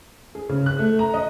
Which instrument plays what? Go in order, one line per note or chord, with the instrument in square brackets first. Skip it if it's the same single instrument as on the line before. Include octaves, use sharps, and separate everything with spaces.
[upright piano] G#4
C#3
F#6
A3
A#5
D#5